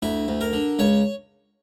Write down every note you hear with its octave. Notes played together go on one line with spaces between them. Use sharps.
D2 E4
D2
A#4
D3
C#2 C#5